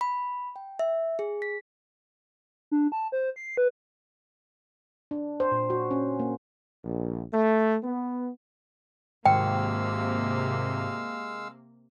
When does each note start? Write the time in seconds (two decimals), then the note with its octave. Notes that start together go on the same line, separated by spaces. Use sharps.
0.01 B5
0.56 G5
0.79 E5
1.19 G#4
1.42 B6
2.71 D4
2.92 A5
3.12 C5
3.36 C7
3.57 B4
5.11 D4
5.40 C5
5.51 A#2
5.70 F#4
5.91 C#4
6.19 A#3
6.85 A#1
7.33 A3
7.84 B3
9.26 G#1 C3 G#3 A#3 F5 G5 E6